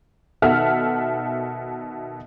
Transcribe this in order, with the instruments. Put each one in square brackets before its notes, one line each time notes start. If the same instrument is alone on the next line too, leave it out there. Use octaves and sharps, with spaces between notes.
[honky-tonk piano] B2 D#3 A4 E5 F#5 F6